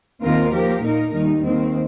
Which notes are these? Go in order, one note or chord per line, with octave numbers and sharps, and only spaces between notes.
D#2 D#3 C4 F4 A#4
F3 A#3 G4 A#4
A#2 A#3 D#4 A#4
D#2 D#3 G3 D#4
D#2 D#3 C4